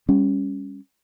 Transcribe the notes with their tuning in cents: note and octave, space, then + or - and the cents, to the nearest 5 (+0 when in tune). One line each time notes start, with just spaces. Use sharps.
G3 +25 C#4 +0